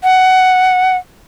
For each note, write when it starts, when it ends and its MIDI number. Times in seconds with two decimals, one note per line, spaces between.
0.03 0.97 78